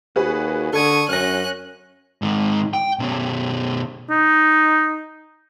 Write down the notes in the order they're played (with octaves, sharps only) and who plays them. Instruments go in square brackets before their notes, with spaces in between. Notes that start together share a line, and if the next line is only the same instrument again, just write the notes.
[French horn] D#2 [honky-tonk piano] F#4 G#4 B4
[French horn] D3 [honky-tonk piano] A4 G#6 [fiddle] C#6 D#6
[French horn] F#2 [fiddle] C#4 F#6 [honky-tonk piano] F6 A#6
[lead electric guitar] G#2 D#3
G5
B2 C#4
[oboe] D#4